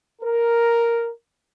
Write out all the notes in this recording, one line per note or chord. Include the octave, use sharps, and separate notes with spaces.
A#4